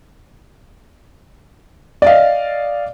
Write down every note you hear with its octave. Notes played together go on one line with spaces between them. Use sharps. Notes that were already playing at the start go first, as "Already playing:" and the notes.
D5 D#5 F5